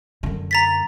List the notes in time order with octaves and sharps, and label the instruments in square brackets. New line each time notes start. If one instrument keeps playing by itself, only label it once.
[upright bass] F#2 D3
[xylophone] A#5 A6 B6